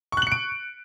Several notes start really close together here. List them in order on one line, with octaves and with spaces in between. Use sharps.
C#6 F#6 F#7 C#7 D7